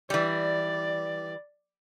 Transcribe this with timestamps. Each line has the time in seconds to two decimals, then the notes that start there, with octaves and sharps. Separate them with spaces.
0.10 E3 G3 D5